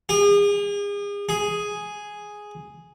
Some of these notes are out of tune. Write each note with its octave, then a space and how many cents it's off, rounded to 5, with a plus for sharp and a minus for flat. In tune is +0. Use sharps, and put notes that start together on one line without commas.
G#4 -40
G#4 +0